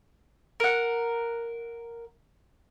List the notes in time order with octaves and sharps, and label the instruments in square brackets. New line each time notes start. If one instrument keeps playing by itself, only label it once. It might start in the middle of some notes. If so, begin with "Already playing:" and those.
[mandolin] A#4 F#5